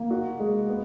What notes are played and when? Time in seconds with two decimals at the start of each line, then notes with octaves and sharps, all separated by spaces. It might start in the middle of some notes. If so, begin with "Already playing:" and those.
Already playing: A#3
0.10 F#4
0.39 G#3
0.68 B3